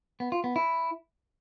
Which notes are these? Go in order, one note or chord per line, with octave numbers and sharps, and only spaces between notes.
B3
F4
B3
E4